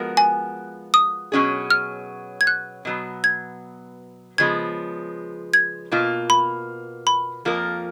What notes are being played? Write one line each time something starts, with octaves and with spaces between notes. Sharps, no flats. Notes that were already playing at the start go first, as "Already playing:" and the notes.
Already playing: F3 G#3 B3 F#4 A#4
G#5
D#6
B2 F#3 C#4 G#4
F6
G#6
F#6
B2 F#3 B3
G#6
C#3 F3 G#3 B3 G#6
G#6
B2 A#3 F4
B5
B5
F2 F3 A#3 F4 A#4